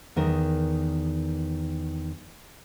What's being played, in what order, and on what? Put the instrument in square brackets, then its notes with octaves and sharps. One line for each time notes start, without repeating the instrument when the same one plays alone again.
[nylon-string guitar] E2 D#3 A#4